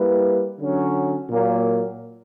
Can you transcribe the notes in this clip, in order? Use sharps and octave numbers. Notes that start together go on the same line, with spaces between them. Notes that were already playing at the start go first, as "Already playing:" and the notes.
Already playing: G3 A#3 E4 B4
D3 F#3 C#4
A#2 F#3 A#3